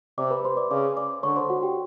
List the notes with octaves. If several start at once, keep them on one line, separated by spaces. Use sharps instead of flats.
C3 D5 D6
B4 B5
C5 C6
D5 D6
C#3 D5 D6
D5 D6
D3 C#5 C#6
C5 C6
F#4 F#5
G4 G5